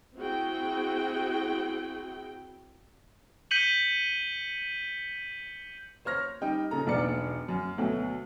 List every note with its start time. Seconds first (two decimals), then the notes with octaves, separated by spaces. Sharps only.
0.16 C4 E4 F#4 G#4 G5
3.51 G6 B6 C#7 D#7 F#7 G7
6.05 C5 C#5 F6 A#6
6.41 G3 D#4 G5
6.71 A#2 C#3 A4 A#5
6.87 E1 B1 D4 D5 C#7
7.48 F#2
7.78 D2 B2 F#3 A3